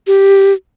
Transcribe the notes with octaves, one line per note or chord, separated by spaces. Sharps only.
G4